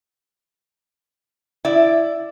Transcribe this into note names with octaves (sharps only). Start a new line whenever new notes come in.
E4 D5